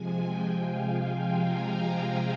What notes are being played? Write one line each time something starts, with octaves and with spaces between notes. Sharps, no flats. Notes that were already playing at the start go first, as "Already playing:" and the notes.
Already playing: C3 F3 G#3 G#5
G5
F5
G5
A#5